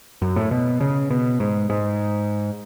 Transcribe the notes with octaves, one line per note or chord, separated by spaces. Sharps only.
F#2
A2
B2
C#3
B2
G#2
G#2